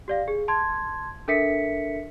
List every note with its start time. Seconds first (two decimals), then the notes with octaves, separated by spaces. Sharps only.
0.08 G4 D5 F5
0.28 G#4
0.48 A5 C6 G#6
1.28 D4 A4 A#4 E5 B6 C#7